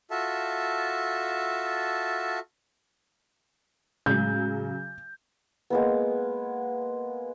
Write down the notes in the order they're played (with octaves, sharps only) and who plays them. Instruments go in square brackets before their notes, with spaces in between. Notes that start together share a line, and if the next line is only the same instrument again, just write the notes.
[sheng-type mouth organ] F4 F#4 A4 E5 A5
[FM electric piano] A2 G#3 [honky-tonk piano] C#3 F#3 [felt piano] G6
[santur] G#3 A#3 B3